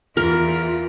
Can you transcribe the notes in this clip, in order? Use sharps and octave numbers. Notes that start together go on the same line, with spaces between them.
E2 E3 F4 A#4